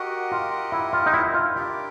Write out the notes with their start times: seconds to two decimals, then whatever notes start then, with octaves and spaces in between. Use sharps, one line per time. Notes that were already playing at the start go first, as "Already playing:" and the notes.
Already playing: F#4 G4 A#4 D#5 F#5
0.32 F4
0.72 E4
0.93 F4
1.06 D#4
1.14 E4
1.34 F4
1.54 D4 G4 A#4 D5